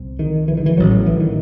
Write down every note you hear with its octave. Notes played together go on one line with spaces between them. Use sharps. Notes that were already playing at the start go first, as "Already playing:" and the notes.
Already playing: C2 C3
D#3
E3
D#3
E3
A1 A2 F#3
F#3
E3
D#3